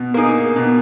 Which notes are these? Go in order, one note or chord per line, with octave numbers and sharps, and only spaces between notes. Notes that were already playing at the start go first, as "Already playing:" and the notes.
Already playing: B2
A#3 D#4 G#4
B2